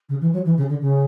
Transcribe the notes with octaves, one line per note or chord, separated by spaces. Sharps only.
C#3
E3
F#3
E3
C#3
D3
C#3